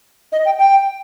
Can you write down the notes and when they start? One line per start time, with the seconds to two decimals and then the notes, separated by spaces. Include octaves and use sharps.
0.32 D#5
0.45 G5
0.59 G5